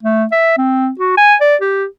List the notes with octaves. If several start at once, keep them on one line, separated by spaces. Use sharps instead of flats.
A3
E5
C4
F#4
G#5
D5
G4